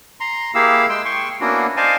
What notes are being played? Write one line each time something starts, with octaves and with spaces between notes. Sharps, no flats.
A#5 C6
A#3 E4 G4 G#4 F5 E6
G#3 G5 C6 E6
G5 C6 C#6
A#3 B3 C#4 D4 E4 F#4
C5 D5 D#5 F5 G#5 A5